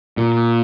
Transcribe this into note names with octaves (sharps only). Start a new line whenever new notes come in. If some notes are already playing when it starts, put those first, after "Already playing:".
A#2